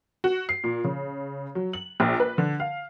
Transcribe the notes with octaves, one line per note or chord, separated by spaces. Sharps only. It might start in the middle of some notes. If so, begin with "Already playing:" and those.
F#4
C7
A#2
C#3
F#3
F#7
A#1
B4
D3
F5